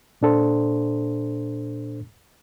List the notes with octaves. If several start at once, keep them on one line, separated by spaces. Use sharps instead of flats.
A#2 D4 A4 C5